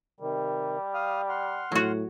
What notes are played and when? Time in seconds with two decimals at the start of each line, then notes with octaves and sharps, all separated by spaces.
0.20 C3 D#3 G3
0.94 F5 D#6 F6
1.29 F#5 C6 F6
1.72 A2 F#3 F#4